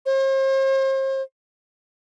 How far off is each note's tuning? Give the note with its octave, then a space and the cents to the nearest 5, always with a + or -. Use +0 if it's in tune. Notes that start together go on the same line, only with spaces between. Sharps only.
C5 +40